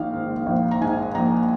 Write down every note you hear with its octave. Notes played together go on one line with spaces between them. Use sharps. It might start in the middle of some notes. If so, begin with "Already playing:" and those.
Already playing: A#1 D#3 F5
G#2
A#1
A#5
G#2 G#5
A#1 A#5